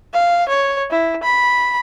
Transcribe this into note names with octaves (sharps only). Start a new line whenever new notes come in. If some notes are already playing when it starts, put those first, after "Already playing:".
F5
C#5
E4
B5